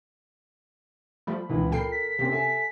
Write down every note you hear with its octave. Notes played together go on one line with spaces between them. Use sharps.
F3 G3 A3 B5
C#2 A#2 E3
A#2 A4 A#4 G5 C7
B6
C3 A#3 C4 C#4
A4 E5 G#5